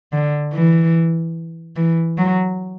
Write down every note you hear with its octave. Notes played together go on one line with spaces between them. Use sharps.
D3
E3
E3
F#3